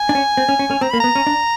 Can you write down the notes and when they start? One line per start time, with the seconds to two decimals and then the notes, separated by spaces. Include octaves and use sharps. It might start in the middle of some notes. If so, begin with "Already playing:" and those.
Already playing: G#5
0.09 D4
0.15 C#4
0.37 C4
0.49 C#4
0.59 C#4
0.71 C#4
0.81 C4 A#5
0.91 A#3 B5
1.00 B3 A#5
1.15 C#4
1.27 D4